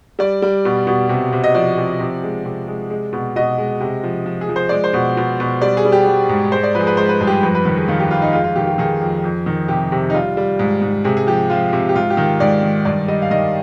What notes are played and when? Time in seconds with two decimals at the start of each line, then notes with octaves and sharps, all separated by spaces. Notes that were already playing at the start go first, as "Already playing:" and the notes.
0.19 G3 D5
0.42 G3
0.65 B2
0.87 B2
1.09 C3
1.33 C3
1.44 D#5
1.55 F3 D5
1.77 C3
2.00 C3
2.23 G#3
2.45 C3
2.68 G#3
2.90 G#3
3.13 B2
3.36 B2 D#5
3.58 G#3
3.80 C3
4.04 F3
4.26 F3
4.41 G#4
4.49 F3
4.56 C5
4.69 G#3 D5
4.84 C5
4.94 B2
5.17 B2
5.40 B2
5.62 G3 D5
5.77 G#4
5.85 G3
5.92 G4
6.07 G3
6.29 G#2
6.52 G#3 C5
6.63 D5
6.75 F3 B4
6.81 G#4
6.87 B4
6.97 G#3 C5
7.09 B4
7.21 G2 G#4
7.27 G4
7.32 G#4
7.43 F2 B4
7.55 B4
7.65 D#3 B4
7.77 G#4
7.88 D#3 F4
8.00 G4
8.11 F2 F4
8.22 D#4
8.33 G#3 F4
8.44 F4
8.56 D#3 G4
8.67 G4
8.78 D#3 G#4
9.01 F2
9.24 F2
9.46 D#3
9.68 C3 G4
9.92 C3
10.10 D#4
10.14 G3 F4
10.37 G3
10.59 G#2
10.82 G#2
11.04 C3 G#4
11.17 G#4
11.27 F3 G4
11.50 F3 F4
11.73 C3
11.89 G4
11.95 G#2 F4
12.10 G4
12.17 D#3
12.40 G#2 D5
12.63 D#3
12.85 G2 D5
13.08 G3 D#5
13.22 F5
13.31 D#3 D#5